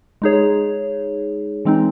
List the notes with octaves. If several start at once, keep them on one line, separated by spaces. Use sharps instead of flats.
G#3 D#4 G#4 C#5
E3 G#3 C4 D#4